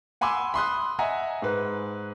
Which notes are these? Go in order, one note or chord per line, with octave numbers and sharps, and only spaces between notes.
F#5 G#5 B5 C6 D6 E6
B5 C6 D#6 F#6
D#5 E5 F#5 G#5 A#5
G#2 B4